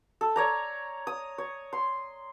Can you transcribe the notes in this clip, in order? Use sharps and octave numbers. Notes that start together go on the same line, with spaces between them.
A4
C#5 D5 A#5
D#6
C#5
C6